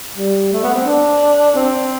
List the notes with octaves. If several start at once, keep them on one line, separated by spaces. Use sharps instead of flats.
G3
A3
B3
C4
D4
C4